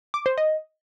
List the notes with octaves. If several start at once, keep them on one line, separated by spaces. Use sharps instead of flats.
D6
C5
D#5